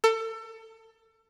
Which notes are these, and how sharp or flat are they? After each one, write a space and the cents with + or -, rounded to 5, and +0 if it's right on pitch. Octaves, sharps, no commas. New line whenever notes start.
A4 +30